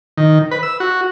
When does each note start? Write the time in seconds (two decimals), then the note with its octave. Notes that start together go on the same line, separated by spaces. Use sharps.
0.18 D#3
0.51 B4
0.63 E6
0.80 F#4